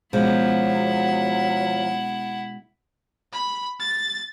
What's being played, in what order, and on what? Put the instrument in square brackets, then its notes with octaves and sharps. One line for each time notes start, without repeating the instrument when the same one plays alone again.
[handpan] B2 G#3 C#4 [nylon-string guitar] F3 [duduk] F#3 [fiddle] E4 F#5
[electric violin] B5
A6